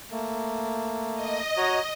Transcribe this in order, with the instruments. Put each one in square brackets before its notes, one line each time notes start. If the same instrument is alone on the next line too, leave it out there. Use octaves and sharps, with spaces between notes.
[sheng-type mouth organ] A3 A#3
[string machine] D#5
[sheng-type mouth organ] F#4 C#5 A#5